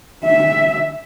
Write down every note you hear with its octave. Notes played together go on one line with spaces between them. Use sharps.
E5